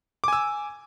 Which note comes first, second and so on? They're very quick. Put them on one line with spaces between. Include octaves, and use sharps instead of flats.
D6 G#5 E6